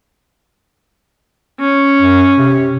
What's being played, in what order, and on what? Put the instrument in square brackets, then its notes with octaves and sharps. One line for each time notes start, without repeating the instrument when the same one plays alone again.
[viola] C#4
[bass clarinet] F#2
C3